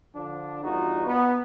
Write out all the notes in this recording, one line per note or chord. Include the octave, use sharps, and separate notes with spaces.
D3 F3 D4
E2 G2 D#4 F4 F#4
B3